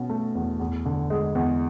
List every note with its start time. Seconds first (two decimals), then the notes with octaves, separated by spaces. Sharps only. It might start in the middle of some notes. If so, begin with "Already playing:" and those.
Already playing: B2 C#4
0.09 A3
0.35 E2
0.59 E2
0.86 D3
1.10 G#3
1.35 E2